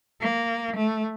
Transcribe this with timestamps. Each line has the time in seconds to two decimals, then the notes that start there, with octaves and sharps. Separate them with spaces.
0.21 A#3
0.76 A3